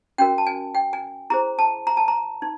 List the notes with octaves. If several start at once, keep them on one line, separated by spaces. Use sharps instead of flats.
C#4 F#4 A#4 G5
A5
G#5
G5
G#5
E4 G#4 C5 A#5
A5
A#5
A5
A#5
D#4